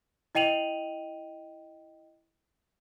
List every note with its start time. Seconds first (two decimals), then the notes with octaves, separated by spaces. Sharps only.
0.35 E4 D#5 G5 D#7 F7 F#7